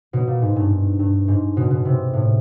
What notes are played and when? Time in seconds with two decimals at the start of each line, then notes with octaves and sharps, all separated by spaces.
0.13 B2
0.27 A#2
0.42 G#2
0.56 G2
0.99 G2
1.28 G#2
1.57 B2
1.71 B2
1.85 C3
2.13 A2